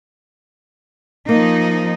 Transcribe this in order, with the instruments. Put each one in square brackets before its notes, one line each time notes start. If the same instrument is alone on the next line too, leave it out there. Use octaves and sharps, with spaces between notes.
[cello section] F3 D#4 [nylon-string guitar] A#3